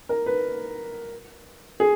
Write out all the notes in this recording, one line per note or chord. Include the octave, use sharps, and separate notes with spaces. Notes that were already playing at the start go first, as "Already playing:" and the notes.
A#4
B4
G#4